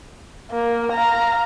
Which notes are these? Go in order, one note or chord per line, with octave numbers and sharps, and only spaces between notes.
A#3
F5 A#5